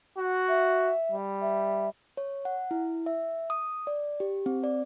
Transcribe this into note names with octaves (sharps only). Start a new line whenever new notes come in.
F#4
E5
G3
E5
C#5
F#5
E4
E5
D#6
D5
G4
C4
D5